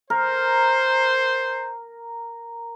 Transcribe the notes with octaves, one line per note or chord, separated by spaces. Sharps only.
A#4 C5